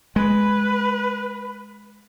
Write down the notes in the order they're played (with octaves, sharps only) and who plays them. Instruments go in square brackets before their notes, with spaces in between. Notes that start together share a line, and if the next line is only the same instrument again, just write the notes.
[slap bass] G#3 [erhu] B4